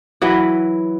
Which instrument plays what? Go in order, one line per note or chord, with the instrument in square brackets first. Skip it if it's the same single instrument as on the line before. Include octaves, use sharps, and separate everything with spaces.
[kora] E3 F#3 B4